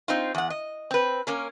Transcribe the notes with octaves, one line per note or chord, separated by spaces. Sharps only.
C4 D#4 F4
E2 F#5
D#5
C4 B4
A#3 C#4 A#4